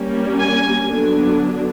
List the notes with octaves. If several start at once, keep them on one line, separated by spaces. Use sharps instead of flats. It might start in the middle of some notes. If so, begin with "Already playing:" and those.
Already playing: G3 A#3 C#4
G#5
D3 F#3 B3 D4